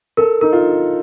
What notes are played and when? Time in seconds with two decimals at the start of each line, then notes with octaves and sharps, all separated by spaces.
0.17 A4 A#4
0.41 D#4 A#4
0.53 F4